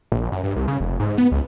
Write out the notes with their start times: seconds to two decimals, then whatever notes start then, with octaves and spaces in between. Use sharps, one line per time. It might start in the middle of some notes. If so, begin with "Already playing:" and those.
0.12 A#1
0.32 F#2
0.43 G2
0.56 C2
0.68 C#3
0.80 F1
1.00 G#2
1.18 B3
1.32 C#2